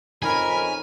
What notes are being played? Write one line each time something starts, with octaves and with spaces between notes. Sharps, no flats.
F2 C#4 D#4 A#4 G#5 B5